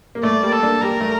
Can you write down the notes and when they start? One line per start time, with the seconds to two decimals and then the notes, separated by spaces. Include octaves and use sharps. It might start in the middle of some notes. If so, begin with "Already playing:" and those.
0.15 A#3
0.23 A3 D5
0.43 G3 A#3
0.52 A4
0.62 A#3 D4
0.81 G3 A#3 A#4
1.00 A3